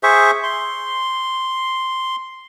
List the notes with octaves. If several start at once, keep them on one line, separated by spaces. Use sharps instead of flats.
G#4 C5 E5 C#6
C6